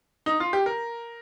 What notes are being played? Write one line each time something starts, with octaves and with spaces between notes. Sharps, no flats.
D#4
F4
G4
A#4